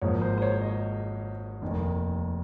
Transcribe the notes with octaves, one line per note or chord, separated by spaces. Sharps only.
G#1 G#2 F3 A#3 C#5
C5
C5
C#5
D#5
F1 D#2 D#3 A#3